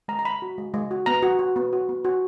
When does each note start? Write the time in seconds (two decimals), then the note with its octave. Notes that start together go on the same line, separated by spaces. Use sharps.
0.08 G#3 A#5
0.19 A#5
0.25 G#3 B5
0.42 F#4
0.58 G#3
0.74 G#3
0.91 F#4
1.06 B3 A#5
1.23 F#4
1.39 F#4
1.56 B3
1.73 F#4
1.89 B3
2.05 F#4